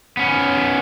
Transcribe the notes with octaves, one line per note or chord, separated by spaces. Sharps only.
B3 C#4